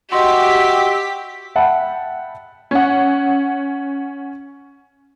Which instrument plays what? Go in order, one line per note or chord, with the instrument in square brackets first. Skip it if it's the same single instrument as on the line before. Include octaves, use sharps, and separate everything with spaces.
[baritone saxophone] F#4 [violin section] G4 B6 [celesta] D#5 C6 [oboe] E5
[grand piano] E5 F#5 G5 A5 B5
[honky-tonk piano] C#4 F#5